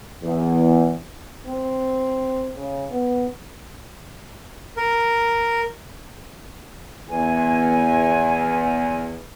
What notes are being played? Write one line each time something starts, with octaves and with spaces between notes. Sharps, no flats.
E2
C4
C#3
B3
A#4
E2 G#5